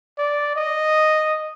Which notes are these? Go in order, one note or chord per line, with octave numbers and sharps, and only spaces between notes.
D5
D#5